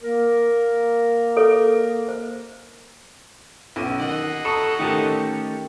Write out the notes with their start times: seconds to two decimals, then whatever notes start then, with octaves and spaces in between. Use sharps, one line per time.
0.02 A#3 A#4
1.37 A4 B4 C#5
2.08 C5
3.76 B1 C#4 D#7
4.00 D#3 D#5 F#5
4.45 A4 A#5 C#6 D#6
4.79 D#3 A3 C#4 G4 A4